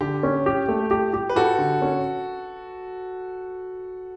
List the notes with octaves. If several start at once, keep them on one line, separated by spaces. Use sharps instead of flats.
D3 G4
C#4
G4
A3
G4
G4
B4
F#4 G4 A4
D3
C#4